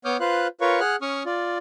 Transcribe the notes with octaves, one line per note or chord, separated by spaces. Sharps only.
B3 C#5 D6 D#6 F6 G6
F4 B4 C5 F5 F#6
F4 A#4 B4 C#5 F5 C#6
G#4 F#5 F6 F#6
C#4 C#6 D#6 F6
F4 D5